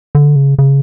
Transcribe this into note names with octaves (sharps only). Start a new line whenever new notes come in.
D3
C#3
C#3